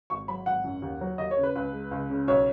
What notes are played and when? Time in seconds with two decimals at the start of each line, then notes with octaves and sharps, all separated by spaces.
0.10 G#1 C#6
0.28 F#3 B5
0.46 G#1 F#5
0.64 F#2
0.82 D#2
1.01 F#3
1.18 D#2 D#5
1.31 C#5
1.37 C#3
1.43 B4
1.55 C#2 B4
1.73 G#3
1.91 C#2
2.10 C#3
2.28 B1 C#5